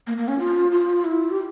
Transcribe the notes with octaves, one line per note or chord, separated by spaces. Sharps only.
A#3
A#3
C#4
F4
F4
E4
G4